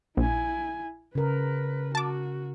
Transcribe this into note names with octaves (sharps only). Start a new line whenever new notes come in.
A#1 E4 G#5
C#3 A#4 B4
F#4 A5 D6